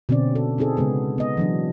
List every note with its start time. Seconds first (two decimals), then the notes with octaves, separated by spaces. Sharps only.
0.09 B2 D3 C4 C#4 D5
0.36 A4
0.58 C4 D#4 G#4 A4
0.77 C#3 G#3 B3 G#4
1.18 B3 D#5
1.37 E3 F#3 D4